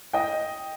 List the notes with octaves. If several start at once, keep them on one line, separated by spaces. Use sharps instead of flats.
D#5 G5